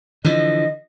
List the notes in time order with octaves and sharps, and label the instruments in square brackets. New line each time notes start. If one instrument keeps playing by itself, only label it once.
[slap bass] D3 E3 F3 [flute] D#5